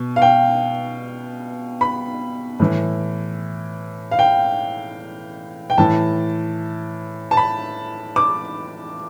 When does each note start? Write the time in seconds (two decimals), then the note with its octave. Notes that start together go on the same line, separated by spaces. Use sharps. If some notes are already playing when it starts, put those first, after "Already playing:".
Already playing: B2
0.16 F5
0.22 G5
1.81 B5
2.60 A2 E3
4.11 F5
4.19 G5
5.70 G5
5.78 A2 E3 A5
7.31 A5
7.37 B5
8.16 D6